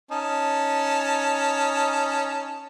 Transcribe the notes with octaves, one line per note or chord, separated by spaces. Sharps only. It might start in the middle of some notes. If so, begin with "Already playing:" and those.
C#4 D#4 A5